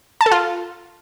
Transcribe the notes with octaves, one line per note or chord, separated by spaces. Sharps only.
A5
A4
F4